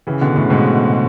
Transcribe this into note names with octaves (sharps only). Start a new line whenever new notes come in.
C#3 E3
B2 D3
A2 C#3
G#2 B2